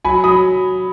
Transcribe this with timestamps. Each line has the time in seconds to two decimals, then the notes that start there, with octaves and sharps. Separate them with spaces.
0.05 F#3 G#5 B5
0.24 F#3 B5 D#6